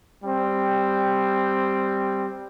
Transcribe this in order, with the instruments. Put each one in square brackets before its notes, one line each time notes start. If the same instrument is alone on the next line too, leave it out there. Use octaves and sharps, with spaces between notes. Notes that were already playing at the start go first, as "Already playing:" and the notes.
[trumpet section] G3 C4